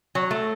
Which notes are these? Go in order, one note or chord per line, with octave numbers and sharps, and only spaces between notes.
F#3
A3